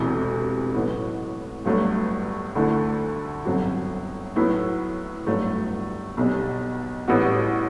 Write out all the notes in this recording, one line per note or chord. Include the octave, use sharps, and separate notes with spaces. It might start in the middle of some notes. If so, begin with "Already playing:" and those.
Already playing: E1 D2 C3 E3
A1 A2 F#3 B3
G1 G2 F#3 A3
D2 D3 A3 E4
G1 F#2 F#3 C4 F#4
A2 F#3 B3 E4
G1 G2 F#3 A3
B1 B2 G3
A1 A2 G3 B3 F#4